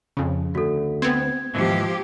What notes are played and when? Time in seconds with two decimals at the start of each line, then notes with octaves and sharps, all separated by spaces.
0.17 F2 C#3
0.55 D2 F#4 A4
1.02 B3 C4 G#6
1.55 D#2 G#2 E3 F3 G4